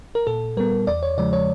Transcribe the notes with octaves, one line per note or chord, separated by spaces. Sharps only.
A#4
A#2 A4
G3 B3 A#4
E2 D5
C#5
C#3 F3 G#3 D5
C#5